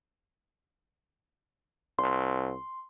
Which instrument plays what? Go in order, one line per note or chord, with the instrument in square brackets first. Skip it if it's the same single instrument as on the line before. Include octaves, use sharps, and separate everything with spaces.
[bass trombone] C2 [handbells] C6